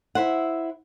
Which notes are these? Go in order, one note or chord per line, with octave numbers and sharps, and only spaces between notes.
E4 C5 F#5